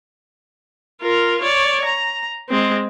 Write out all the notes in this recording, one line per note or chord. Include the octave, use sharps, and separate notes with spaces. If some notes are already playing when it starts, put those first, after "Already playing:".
F4 A#4
C#5 D5
A#5
G#3 C4